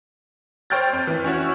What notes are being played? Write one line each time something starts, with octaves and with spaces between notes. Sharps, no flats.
C5 C#5 G5 F6 G6 A6
F2
E3
C#4 E4 F#4 C#5